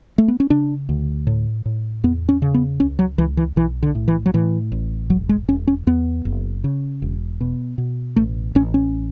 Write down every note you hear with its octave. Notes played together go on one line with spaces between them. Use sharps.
A3
B3
C#4
C#3 D4
D2
A2
A2
E2 B3
C#4
C#3
B3
C#2 C#4
F#3
C#2 E3
E3
B1 E3
D3
A2
E3
F#3
A2 E3
A1
E1 F#3
G#3
E1 C#4
C#4
E2 B3
F#1
C#3
E1
B2
B2
A1 A3
A1 C#4
C#4